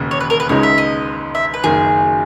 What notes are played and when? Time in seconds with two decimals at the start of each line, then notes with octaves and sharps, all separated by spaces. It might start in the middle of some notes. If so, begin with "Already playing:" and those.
Already playing: E1 D#2 C#3
0.11 C#5
0.20 B4
0.30 A#4
0.40 B4
0.49 C#2 C#3 G#3 D#4 C#5
0.63 E5
0.78 D#5
1.35 E5
1.54 B4
1.64 F#1 F#2 D#3 G#4